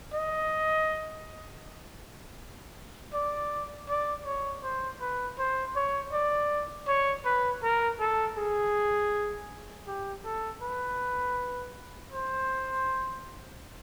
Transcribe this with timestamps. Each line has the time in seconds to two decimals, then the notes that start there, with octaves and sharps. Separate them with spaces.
0.14 D#5
3.14 D5
3.89 D5
4.26 C#5
4.63 C5
5.01 B4
5.38 C5
5.76 C#5
6.13 D5
6.88 C#5
7.25 B4
7.63 A#4
8.00 A4
8.38 G#4
9.87 G4
10.25 A4
10.62 B4
12.12 C5